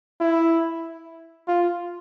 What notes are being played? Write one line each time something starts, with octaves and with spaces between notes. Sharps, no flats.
E4
F4